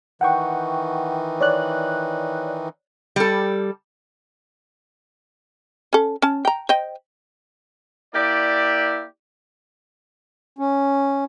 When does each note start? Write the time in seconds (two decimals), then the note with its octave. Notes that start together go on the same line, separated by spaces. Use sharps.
0.21 D#3 E3 F#5 G5 C#6
1.41 C#5 D5 F#6
3.16 G3 A4
5.93 C#4 A4
6.22 C#4 A5
6.45 G5 A#5
6.69 C5 D#5 G5
8.14 A#3 E4 G4 D5
10.58 C#4